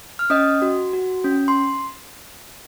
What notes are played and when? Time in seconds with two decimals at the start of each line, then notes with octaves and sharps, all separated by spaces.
0.19 F6
0.30 C#4 D#5 D#6
0.62 F#4
0.93 F#4
1.24 C#4
1.48 C6